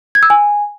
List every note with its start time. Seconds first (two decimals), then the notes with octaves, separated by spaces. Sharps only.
0.15 G#6
0.23 E6
0.30 G#5